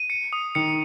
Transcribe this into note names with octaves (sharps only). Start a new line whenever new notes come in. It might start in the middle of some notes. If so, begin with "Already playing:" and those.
Already playing: D#7
C#7
D#6
D#3 C#7